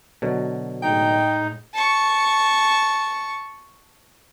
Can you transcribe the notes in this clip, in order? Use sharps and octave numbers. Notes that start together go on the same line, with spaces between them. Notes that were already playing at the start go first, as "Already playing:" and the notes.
B2 D3 F#3
A2 G#3 D#4 G5
A5 C#6